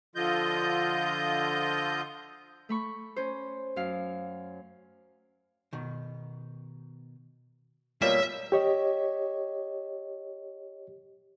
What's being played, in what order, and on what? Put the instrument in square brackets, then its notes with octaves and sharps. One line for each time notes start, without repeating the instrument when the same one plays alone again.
[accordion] D3 F3 F4 D#5 G6
[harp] A3 B5 C#6
C#4 C5
F#2 F5
[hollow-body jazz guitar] B2 D#3
[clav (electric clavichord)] B2 G3 A#3 [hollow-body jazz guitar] F4 D#5 [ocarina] C#5 [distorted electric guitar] E5
[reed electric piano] G4 C#5 D#5